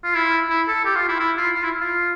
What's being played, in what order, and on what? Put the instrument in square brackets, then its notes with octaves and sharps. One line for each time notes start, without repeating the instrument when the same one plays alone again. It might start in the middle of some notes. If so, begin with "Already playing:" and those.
[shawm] F4
E4
E4
A4
G4
F4
E4
E4
F4
F4
E4
F4